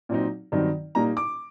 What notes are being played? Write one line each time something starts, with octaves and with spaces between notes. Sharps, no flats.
A#2 F#3 C4 D#4
G2 D#3 F#3 C4 D#4
A#2 G3 A#3 D#4 A#5
D6